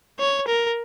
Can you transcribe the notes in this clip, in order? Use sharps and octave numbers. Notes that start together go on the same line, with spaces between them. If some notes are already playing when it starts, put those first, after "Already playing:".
C#5
A#4